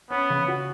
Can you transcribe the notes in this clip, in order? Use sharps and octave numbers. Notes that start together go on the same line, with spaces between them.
B3 C#4
C#3
F#4